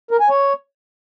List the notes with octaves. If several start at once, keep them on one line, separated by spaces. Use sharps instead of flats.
A#4
G#5
C#5